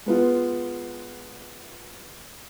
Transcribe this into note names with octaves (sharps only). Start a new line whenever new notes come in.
G#3 B3 F4